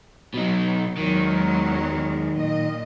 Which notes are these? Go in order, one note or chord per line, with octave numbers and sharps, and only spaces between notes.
B2 F#3 D#4
E2 D#3 F#3 G#3
A#2 D#5